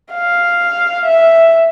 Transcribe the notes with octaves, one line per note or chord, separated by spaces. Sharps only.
F5
E5